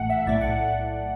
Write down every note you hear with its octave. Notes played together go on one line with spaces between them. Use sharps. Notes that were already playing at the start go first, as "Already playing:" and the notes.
Already playing: A1 A2 A3 F#5
E5
B1 A2 A3 D5
F#5